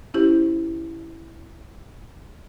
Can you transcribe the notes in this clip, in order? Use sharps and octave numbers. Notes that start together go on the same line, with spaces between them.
C#4 E4 G4 C5